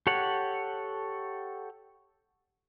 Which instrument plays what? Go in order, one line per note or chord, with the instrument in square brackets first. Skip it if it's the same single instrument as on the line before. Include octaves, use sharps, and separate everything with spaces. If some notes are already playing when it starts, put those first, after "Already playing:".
[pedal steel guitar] G4 A4 C#5 F#5